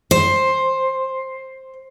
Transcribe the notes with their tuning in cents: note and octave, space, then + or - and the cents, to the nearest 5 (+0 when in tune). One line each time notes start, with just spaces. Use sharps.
C5 +10